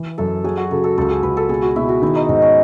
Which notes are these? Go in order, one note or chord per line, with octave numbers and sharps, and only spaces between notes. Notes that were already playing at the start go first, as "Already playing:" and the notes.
Already playing: E3
F#2 A4
F#3 G#4
F#4
C#3 A4
A4
C#2 A4
G#4
C#2 B4
A4
B2 G#4
F#4
B2 E4
F#4
D#3 E4
D#4
G#2 D#4
C#4